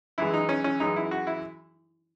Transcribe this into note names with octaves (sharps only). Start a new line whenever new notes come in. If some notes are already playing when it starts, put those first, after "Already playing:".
F#2 E3 G#3 E4
D#4
C#4
C#4
F#2 E3 G#3 D#4
E4
F#4
E4